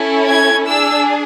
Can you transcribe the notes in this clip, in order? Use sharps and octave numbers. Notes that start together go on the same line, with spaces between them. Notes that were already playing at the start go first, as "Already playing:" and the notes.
Already playing: C#4 E4 A4
G#6
D4 G#4 E6